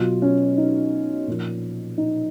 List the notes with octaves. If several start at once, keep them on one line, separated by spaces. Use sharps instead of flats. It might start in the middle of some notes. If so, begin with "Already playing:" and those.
Already playing: B2 F#3 F4
C#4
D#4
A#2 F3
D#4